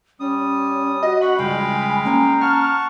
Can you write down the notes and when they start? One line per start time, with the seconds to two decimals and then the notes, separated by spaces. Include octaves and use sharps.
0.20 G3 C#4 D#6
1.03 F#4 D#5
1.21 F#5 B5 C#6
1.38 C#2 G2 G#3 F5 G5 G#5
2.05 A#3 C#4 G#5 A#5
2.41 F#5 A5 C#6 F6